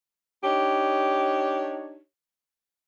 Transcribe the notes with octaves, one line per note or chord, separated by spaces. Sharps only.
D4 D#4 G4 C#5